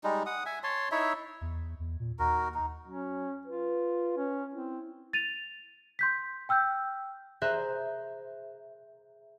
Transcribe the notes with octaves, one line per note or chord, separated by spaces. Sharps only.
G3 G#3 D#4
F#5 D#6
E5 G#5
C#5 A5 C6
D#4 E4 C#5 E5
E2
E2
A#2
D#2 D#4 F#4 A#4
D#4
F#3 C#4
F4 B4
C#4
C4 E4
A6 D#7 F7
C6 G6 B6
G5 E6 F6 G6
G#4 C5 E5 A#5 F#6